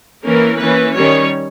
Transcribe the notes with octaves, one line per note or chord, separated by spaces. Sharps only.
E3 A#3 C#4 A#4
E3 A#3 C#4 B4
D#3 G3 C#4 C#5